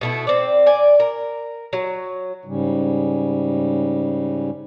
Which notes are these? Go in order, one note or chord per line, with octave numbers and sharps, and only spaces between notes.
B2 A3 E4
C4 D5
D5 G#5
A#4
F#3
G#2 C#3 G3